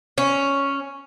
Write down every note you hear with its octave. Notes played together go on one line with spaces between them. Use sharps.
C#4